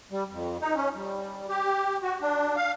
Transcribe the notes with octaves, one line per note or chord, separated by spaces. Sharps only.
G3
F2
D#4
C#4
G3
G4
F#4
D4
F5